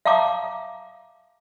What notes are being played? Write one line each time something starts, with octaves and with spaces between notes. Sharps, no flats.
E5 F5 A5 A#5 D6